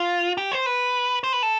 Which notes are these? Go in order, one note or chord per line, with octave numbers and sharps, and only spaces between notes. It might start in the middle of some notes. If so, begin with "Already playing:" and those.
Already playing: F4
G4
C5
B4
C5
B4
A4